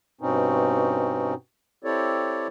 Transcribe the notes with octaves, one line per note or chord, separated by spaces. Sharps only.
G2 B2 C4 C#4 D#4
C4 E4 G4 A4 C#5 D5